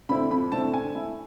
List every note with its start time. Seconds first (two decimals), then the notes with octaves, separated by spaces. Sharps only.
0.09 D3 A3 C4 E4 B5
0.31 F2 B5
0.52 D3 A3 C4 E4 A5
0.74 D3 G#5
0.95 A3 E4